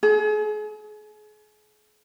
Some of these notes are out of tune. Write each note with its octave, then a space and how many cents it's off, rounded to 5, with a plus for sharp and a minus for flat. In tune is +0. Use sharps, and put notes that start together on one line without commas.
G#4 +40